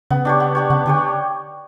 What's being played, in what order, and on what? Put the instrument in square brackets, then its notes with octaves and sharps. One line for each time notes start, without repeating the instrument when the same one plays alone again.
[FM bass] C#3 [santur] B3
[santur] D4 G4 C#5
B3
D4 G4 C#5
[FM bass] C#3 [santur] B3
[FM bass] D3 [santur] D4 G4 C#5